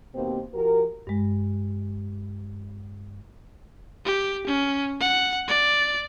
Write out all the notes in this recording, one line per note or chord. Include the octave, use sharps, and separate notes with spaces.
D#2 B2 A#3 C4 G4 C5
F3 F#4 G4 A#4
G2 G#3
G4
C#4
F#5
D5